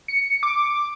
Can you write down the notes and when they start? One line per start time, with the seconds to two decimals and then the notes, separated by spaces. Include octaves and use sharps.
0.08 C#7
0.43 D6